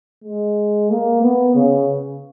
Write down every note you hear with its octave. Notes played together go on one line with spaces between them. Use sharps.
G#3
A#3
B3
C#3